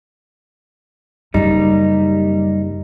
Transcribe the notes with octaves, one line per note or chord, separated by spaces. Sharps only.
F#1 F#2 G3 D#4